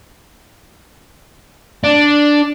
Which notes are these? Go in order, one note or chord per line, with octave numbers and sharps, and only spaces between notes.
D4